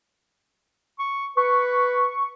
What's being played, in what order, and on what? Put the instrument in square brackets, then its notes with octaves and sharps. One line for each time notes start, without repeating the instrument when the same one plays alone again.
[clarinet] C#6
[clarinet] B4 [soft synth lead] C#6